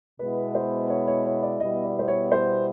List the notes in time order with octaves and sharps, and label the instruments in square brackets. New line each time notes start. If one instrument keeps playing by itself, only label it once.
[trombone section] B2 G#3 B3 E4 [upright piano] B4
[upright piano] C5
C#5
C#5
C#5
D5
[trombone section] B2 G3 B3 E4 [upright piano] D#5
[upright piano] D5
C5
C#5
C5